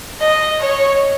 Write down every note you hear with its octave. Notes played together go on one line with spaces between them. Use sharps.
D#5
C#5